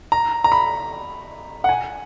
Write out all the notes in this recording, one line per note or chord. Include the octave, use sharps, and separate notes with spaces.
A#5
A#5
B5
F#5
G#5